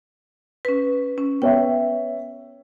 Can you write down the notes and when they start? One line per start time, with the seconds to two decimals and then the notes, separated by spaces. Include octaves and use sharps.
0.65 C#4 B4
1.18 C#4
1.42 B3 C#5 E5 G5